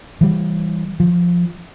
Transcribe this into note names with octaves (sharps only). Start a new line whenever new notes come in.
E3 G3
F3